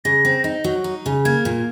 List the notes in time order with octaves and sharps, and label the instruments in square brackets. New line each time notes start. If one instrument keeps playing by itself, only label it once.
[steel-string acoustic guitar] C#3 [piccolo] A#6
[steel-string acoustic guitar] C4
D#4
F#3
D#4
C#3
[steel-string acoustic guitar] A#3 [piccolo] G#6
[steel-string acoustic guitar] A#2